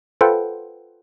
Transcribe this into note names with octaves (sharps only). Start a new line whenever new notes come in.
F4 A4 B4 C5 F#5 G5